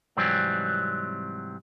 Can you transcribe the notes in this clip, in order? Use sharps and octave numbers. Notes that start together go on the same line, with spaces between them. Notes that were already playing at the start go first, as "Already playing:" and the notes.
G#2 C3 E3 F#3 G3 C4